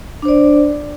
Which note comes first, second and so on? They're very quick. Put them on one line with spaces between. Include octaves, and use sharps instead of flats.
D4 C5 D5